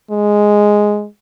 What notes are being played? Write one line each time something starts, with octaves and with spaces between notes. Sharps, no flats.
G#3